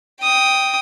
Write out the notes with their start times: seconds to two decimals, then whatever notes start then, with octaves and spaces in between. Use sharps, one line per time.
0.22 G5 D#6